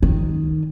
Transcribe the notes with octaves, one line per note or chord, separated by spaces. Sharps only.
D#3